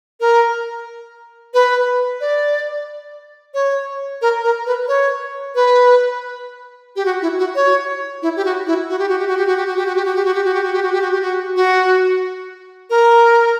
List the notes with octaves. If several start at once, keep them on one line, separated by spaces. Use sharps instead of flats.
A#4
B4
D5
C#5
A#4
A#4
B4
C#5
B4
G4
F#4
E4
F#4
C#5
E4
G4
F#4
E4
F#4
G4
F#4
G4
F#4
G4
F#4
G4
F#4
G4
F#4
G4
F#4
G4
F#4
G4
F#4
G4
F#4
G4
F#4
G4
F#4
G4
F#4
F#4
A#4